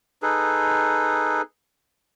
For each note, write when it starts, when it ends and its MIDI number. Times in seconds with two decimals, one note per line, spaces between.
0.22 1.42 63
0.22 1.42 68
0.22 1.42 69
0.22 1.42 71